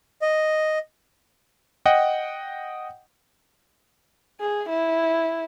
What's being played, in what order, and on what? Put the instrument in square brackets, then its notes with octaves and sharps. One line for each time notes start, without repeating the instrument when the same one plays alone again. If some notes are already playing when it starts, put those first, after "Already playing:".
[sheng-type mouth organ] D#5
[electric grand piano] D#5 F#5 G5
[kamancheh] G#4
E4